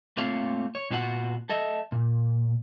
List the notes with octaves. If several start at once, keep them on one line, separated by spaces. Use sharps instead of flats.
A3 A#3 C4 F4 C#5 F5
C#5
A#2 B3 F4 F#4 B4 F#5
A4 D#5 E5
A#2